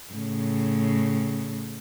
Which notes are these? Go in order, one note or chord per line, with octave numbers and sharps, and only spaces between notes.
A2 C#3